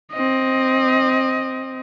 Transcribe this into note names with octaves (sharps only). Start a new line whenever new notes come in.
C4 D#5